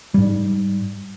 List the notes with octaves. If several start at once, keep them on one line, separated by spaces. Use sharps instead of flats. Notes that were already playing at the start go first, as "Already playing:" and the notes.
G#2 G3